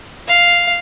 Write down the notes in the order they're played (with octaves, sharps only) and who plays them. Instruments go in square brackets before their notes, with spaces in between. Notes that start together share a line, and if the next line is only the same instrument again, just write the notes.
[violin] F5